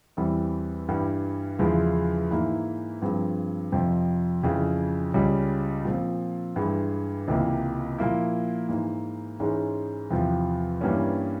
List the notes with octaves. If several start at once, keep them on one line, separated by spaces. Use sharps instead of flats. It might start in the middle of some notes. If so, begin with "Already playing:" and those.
E2 E3 G3 C4
G2 E3 G3
E2 C#3 F3 G#3 E4
G#2 E3 A#3 E4
G2 F3 G#3 C4
F2 C3 F3
F2 C#3 E3
C#2 C#3 G3 C#4
A#2 F3 C4
G2 E3 G#3
C#2 C3 E3 A#3
A#2 F3 A#3 E4
G#2 E3 A#3
G#2 E3 G#3 C#4
E2 C3 F3
G2 E3 G3 A#3 C#4